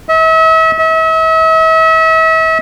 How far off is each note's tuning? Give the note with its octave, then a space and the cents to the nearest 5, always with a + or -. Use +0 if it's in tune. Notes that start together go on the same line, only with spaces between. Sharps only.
E5 -40
E5 -40